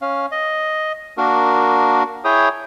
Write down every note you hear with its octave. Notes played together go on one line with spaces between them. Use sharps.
C#4 F5
D#5
A#3 D4 F#4 A#4
E4 G#4 C#5 G5 D#6